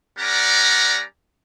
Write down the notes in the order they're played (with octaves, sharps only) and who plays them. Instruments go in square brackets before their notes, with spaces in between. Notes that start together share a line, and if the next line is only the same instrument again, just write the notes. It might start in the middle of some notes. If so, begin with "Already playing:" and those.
[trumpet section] G3 C#4 A#4 D5 F#5 A#5